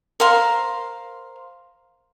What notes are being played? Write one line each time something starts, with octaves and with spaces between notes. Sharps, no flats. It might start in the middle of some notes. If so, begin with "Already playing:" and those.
A#4 C5 F5 C6